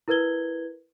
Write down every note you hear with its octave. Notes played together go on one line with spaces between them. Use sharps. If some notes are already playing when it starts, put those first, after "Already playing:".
E4 A#4 B4 G#6 G7